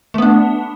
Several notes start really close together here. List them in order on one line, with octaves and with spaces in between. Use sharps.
A3 B3 D4